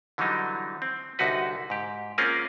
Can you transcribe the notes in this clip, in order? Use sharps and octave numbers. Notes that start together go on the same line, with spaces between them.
D3 E3 F#3 G3 D#4
C4
C2 D3 D#4 F#4 B4
G#2 G4
A#3 C4 C#4 F4 G#4 A#4